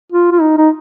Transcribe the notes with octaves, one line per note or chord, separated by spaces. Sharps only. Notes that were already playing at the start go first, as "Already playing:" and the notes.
F4
F4
D#4
D#4